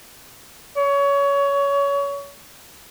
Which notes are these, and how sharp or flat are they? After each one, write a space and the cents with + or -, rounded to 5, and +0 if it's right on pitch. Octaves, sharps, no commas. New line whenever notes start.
C#5 +25